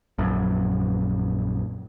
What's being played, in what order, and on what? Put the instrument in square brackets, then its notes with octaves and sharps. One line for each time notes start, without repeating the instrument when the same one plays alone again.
[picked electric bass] A#1 F#2